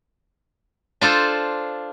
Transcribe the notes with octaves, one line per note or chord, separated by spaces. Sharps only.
D4 F4 A4 C5